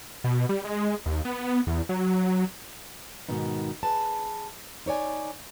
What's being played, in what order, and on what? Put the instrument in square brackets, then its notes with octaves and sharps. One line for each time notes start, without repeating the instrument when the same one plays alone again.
[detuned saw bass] B2
G3
G#3
D#2
B3
E2
F#3
[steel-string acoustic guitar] G#2 B2 D#3 B3 D#4
G#4 B4 A5
D#4 C#5 D5 G#5